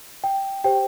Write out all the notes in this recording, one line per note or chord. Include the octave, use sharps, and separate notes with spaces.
G5
G4 C5 G5